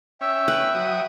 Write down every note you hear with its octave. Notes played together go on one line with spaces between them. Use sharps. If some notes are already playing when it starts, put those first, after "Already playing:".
C#4 E5 G5 E6
B4
F#3 D#6